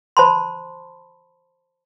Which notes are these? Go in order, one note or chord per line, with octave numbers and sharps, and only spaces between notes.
C5 A5 B5 C6